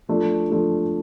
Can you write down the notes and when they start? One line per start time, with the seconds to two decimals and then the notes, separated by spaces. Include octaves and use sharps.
0.09 F3 A3 D4
0.50 F3 A3 D4